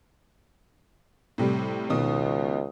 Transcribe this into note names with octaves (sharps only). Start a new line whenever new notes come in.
A2 C3 G3
C#2 B2 D#3 D#6